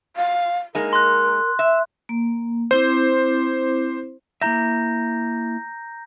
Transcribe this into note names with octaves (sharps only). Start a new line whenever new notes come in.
F5
G#3 A#3 D#4 A#4
C6 F#6
E5
A#3
C4 E4 C5 D6
A#3 E4 E5 A#5 G6 A#6